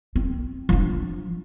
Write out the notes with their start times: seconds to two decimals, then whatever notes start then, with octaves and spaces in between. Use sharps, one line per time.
0.16 C4
0.69 F3 D4